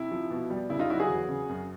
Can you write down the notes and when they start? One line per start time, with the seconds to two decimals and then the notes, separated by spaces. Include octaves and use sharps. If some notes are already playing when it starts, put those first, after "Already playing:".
Already playing: C3 E4
0.11 F3
0.30 B2
0.50 G3
0.69 C#3 E4
0.79 D#4 F4
0.90 F#3 E4 F#4
1.00 F#4 G#4
1.10 E2
1.29 C#3
1.49 F#2